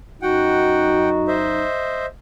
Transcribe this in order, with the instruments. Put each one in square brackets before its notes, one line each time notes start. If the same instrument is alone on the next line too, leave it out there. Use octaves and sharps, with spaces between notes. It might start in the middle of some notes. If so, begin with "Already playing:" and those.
[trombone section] F#2 D#4 [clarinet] F#4 [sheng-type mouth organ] F#5 G5
[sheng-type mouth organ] C5 D#5 E5